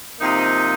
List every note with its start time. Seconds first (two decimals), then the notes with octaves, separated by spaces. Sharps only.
0.20 C3 F3 A#3 D#4